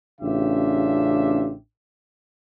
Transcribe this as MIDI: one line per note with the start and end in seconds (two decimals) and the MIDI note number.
0.21 1.53 33
0.21 1.53 49
0.21 1.53 62
0.21 1.53 65
0.21 1.53 67
0.21 1.53 76